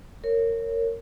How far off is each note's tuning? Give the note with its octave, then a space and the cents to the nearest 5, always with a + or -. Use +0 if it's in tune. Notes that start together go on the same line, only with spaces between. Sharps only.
A#4 -20 C#5 +0